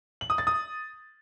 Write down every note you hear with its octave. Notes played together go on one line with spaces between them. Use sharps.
F#7
D#6
A6
D#6